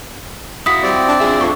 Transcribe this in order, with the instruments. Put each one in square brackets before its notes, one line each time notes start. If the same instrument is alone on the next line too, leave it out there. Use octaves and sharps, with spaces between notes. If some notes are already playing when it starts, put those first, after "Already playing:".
[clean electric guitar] E4 F#4 [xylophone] D#6 B6
[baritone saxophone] G3 [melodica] C4 D5
[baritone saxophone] D4
[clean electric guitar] D4 F4 E5 [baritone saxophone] G#4
[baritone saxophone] F2 [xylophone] C#6